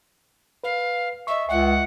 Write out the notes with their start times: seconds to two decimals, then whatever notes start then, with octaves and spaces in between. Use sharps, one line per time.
0.64 B4 F5
1.27 D#5 E5 C#6
1.49 C#2 E5 F#5